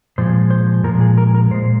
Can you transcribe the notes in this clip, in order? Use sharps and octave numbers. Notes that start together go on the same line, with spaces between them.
A#2 F3 G#3 C5
C5
A#2 F3 G#3 A#4
G#4
A#4
A#4
A#2 G#3 C5